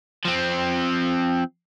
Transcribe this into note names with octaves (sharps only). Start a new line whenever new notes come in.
F3 C4